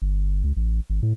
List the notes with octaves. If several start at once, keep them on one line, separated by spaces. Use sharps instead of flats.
G1
C#2
A1
G#1
A2